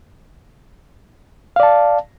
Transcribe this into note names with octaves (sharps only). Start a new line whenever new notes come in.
D5 F5 A5